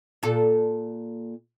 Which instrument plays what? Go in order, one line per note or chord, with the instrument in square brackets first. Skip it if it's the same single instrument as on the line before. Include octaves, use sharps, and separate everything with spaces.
[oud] A#2 A4